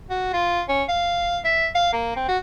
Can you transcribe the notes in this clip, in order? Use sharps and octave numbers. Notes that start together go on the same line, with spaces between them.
F#4
F4
C#4
F5
E5
F5
A#3
C4
F#4